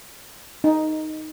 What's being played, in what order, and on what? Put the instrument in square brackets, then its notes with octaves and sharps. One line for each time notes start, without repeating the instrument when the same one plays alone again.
[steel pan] D#4